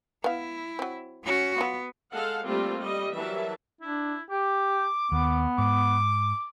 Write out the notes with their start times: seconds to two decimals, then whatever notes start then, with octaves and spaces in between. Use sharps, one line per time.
0.24 B3 E4 F5
0.79 F#3 C4
1.24 C#4 F#4
1.58 F#3 B3 F4
2.13 G#3 A4 F5 F#5
2.47 G3 A3 A#3 C4 F4 G4
2.79 G3 D#5
3.15 E3 F#3 G3 A#4 E5 A5
3.81 D4 E4
4.31 G4 D6
5.12 D#2 B3
5.58 G#2 D6